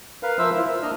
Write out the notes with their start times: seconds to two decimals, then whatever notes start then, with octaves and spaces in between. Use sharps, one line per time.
0.23 A#4 B4 F5
0.39 F3 A#4 C5 E5 E6
0.57 E4 F4
0.69 E6
0.82 A#3 D4 D#5 F6